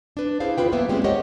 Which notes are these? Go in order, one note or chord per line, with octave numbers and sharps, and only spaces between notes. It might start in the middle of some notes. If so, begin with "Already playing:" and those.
D4 B4
E4 G#4 C5 F5
D#2 C3 E4 F4 B4 G5
F#2 A#3 B3 E5
G3 G#3 C4 C#4 G4
G4 A#4 C5 C#5 D#5 F#5